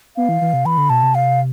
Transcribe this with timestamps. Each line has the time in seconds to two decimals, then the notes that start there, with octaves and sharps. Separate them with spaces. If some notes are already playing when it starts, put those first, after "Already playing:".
0.17 B3 F5
0.29 E3
0.41 E3
0.53 C3
0.65 E3 B5
0.78 D3
0.90 B2 A5
1.03 C3
1.15 F5